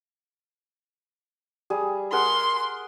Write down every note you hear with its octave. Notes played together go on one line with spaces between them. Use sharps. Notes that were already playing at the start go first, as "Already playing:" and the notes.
G3 G#4
G#4 A#4 F#5 C6